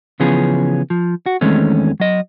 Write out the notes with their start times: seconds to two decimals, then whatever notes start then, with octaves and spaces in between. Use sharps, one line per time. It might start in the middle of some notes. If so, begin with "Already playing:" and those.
0.20 C#3 E3 F3 B3 C#4 G#4
0.90 F3
1.26 F#4
1.41 E2 D#3 G#3 A3 C4 C#4
2.00 F#3 D#5